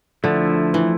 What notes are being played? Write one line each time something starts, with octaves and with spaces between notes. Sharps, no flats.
D3 F3 A3 E4
E3